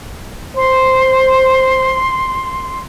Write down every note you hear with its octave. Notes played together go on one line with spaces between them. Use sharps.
C5 C6